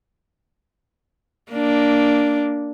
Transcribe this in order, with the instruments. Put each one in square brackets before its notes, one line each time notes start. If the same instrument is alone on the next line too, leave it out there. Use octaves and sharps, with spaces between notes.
[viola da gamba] A#3 D4